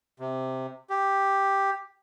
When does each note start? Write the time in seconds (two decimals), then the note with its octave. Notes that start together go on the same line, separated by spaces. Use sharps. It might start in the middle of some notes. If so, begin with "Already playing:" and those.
0.20 C3
0.90 G4